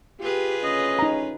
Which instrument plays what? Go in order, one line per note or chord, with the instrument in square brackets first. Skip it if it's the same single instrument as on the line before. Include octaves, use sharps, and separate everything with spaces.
[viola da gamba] F4 G#4 B4 [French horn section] G4
[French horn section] D2 C#3 C#4 [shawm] D#5
[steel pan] D#4 A#5